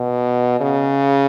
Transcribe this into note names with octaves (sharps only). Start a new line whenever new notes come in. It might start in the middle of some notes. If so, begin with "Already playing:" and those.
Already playing: B2
C#3